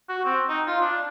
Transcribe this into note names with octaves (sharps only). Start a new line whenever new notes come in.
F#4
C4
D#4
F4
D4